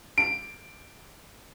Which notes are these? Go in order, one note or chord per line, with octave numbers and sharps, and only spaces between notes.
D7